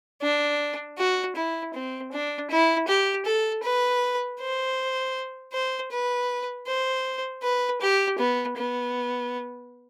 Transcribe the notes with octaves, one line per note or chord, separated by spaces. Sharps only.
D4
F#4
E4
C4
D4
E4
G4
A4
B4
C5
C5
B4
C5
B4
G4
B3
B3